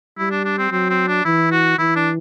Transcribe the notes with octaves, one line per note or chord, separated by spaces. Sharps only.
G3 E4
D4
D4
C4
F#3 C4
C4
D4
E3 E4
F#4
E3 E4
D4